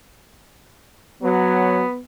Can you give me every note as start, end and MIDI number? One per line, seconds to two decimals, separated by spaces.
1.23 1.82 54
1.23 1.99 59